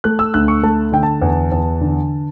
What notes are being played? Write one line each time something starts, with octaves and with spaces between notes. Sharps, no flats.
A3 F#6
E6
D2 F#6
C#6
A3 A5
D3 G5
A5
E2
E2
D3